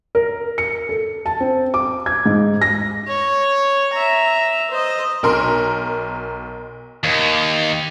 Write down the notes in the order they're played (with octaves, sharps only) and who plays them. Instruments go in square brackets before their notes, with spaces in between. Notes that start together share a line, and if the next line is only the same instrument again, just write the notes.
[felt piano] A#4
C#7
A4
A5
C4
D6
G#6
G#2
A#6
[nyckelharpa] C#5
E5 A#5
C5 D#5
[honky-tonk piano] B1 A#4 C6
[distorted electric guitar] D#2